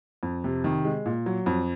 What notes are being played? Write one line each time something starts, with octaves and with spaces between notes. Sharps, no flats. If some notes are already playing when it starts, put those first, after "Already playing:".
F2
C3
D#3
G#3
A#2
F#3
F2